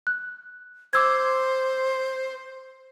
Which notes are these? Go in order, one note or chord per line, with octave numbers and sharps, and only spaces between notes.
F#6
C5 D6 E6 G#6